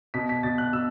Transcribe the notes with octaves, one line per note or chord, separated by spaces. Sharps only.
B2 B6
B6
B2 A6
F#6
B2 E6